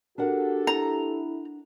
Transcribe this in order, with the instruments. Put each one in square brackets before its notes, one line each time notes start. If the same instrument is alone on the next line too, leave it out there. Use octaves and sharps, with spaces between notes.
[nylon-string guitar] D4 A#4 F#5 [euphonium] F#4 [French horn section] G4 A4
[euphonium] E4 [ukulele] A#5